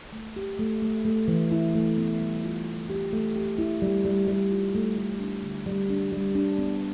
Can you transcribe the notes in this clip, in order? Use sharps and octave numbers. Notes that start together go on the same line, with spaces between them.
A3
G4
A3
A3
A3
E3
E4
A3
B3
G3
F4
B3
G4
A3
G4
E4
G3
G3
G3
F4
A3
A3
D4
D3
G3
D4
G3
D4
B3